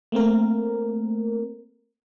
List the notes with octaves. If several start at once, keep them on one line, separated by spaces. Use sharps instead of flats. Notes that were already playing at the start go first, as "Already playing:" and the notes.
A3 A#3 C4 A#4